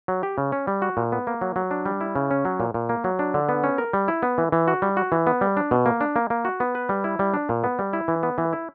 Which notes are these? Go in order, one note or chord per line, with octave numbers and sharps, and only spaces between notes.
F#3
G4
C#3
C#4
G3
F#4
A#2
B3
A#3
F#3
F#3
D4
G3
E4
C#3
C#4
F#3
A#2
A#2
A#3
F#3
D4
D3
B3
C#4
A#4
G3
E4
B3
E3
E3
F#4
G3
F#4
E3
B3
G3
D4
B2
A#3
D4
A#3
A#3
F#4
B3
B4
G3
E4
G3
D4
A#2
B3
G3
E4
E3
B3
E3
E4